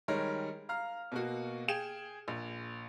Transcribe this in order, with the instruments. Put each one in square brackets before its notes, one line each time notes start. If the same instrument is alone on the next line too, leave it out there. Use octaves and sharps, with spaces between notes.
[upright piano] D#3 G3 G#3 A#4 C#5
F5 A#5 F6
B2 A#3 F#4
G#4 G5 E7
A#1